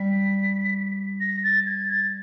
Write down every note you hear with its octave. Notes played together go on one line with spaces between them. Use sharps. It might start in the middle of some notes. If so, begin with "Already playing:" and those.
Already playing: G3 B6
A#6
A6
G#6
A6